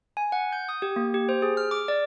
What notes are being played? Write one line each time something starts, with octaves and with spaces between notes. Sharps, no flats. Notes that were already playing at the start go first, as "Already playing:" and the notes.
G#5
F#5
G6
D#6
G4
A#3
G4
C5
G#4
F6
D6
D5